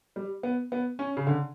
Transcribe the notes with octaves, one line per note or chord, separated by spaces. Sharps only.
G3
B3
B3
C#4
C#3
D3